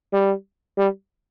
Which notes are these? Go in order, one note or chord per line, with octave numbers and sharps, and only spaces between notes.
G3
G3